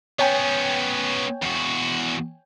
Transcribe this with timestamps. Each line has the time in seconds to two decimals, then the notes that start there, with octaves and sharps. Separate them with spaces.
0.19 B3 C#4 C#5 G5 G#5
1.42 E2 F#4